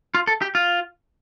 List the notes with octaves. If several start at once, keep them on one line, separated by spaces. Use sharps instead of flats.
F4
A4
G4
F4